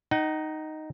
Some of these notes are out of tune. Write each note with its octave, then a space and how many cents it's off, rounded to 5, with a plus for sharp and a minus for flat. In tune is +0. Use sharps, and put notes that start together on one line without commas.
D#4 +0 F#5 +45